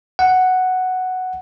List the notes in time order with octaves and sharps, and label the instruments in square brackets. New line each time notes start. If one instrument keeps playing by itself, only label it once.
[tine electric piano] F#5